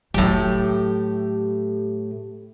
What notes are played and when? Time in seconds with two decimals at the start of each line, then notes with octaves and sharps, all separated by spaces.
0.14 A2 F#3 E4 G4